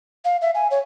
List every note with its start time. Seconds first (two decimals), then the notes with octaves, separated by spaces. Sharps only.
0.25 F5
0.42 E5
0.55 G#5
0.71 C#5